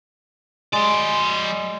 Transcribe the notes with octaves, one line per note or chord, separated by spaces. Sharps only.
F#3 G#3 D5